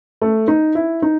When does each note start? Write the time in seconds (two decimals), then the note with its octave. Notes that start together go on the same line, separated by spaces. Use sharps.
0.22 A3
0.48 D#4
0.75 E4
1.02 D#4